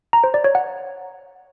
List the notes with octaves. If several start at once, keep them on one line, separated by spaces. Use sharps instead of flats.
A#5
C5
D5
C#5
F#5